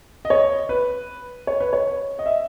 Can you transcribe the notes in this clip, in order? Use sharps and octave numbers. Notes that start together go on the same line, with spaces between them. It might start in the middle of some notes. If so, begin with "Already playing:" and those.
D#5
C#5
B4
C#5
B4
C#5
D#5
E5